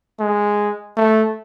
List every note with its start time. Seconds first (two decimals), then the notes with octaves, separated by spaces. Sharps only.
0.20 G#3
0.97 A3